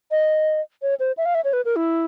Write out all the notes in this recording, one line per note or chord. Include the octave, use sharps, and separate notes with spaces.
D#5
C#5
C5
E5
F5
E5
C#5
B4
A#4
E4